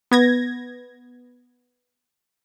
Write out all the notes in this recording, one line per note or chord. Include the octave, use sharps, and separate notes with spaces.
B3 G#6 A#6